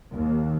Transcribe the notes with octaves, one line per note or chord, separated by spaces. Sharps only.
D#2